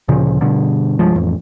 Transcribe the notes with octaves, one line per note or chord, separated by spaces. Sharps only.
D2 A#2 C#3 F3
G2 B2 D3
C2 G2 F3 G#3
A1 F2